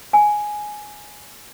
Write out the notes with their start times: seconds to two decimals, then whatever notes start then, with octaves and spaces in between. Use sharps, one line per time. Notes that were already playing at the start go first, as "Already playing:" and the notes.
0.13 G#5